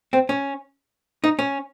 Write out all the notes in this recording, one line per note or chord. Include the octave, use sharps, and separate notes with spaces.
C4
C#4
D#4
C#4